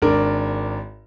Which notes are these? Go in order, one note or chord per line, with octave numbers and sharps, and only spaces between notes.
G#1 D4 A#4